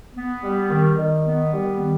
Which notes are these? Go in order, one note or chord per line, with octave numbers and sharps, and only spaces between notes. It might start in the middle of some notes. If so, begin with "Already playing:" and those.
B3
G3
D#3
D#3
B3
G3
D#3